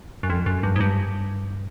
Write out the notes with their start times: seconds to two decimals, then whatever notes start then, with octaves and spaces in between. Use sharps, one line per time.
0.23 F#2
0.30 F2
0.46 F#2
0.63 G2
0.76 G#2
0.80 G2